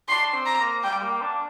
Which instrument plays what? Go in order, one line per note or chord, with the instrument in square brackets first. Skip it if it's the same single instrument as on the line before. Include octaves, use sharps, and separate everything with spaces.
[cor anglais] D4 [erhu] C6
[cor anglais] C4
[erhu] A#5
[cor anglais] A#3
[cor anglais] G3 [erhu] G5
[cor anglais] A#3
D4